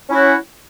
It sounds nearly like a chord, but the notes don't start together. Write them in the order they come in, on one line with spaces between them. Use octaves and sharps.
C#4 E4 F#4